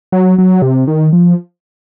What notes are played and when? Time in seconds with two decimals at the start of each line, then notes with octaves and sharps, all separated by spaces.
0.12 F#3
0.38 F#3
0.62 C3
0.87 D#3
1.13 F3